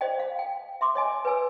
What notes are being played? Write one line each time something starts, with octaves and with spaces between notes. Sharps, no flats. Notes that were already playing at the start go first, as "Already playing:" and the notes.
C5 D5 D#5 F5 G5
F5
G5
E5 C6 D6
C#5 D#5 G#5
B4 C#5 G#5 E6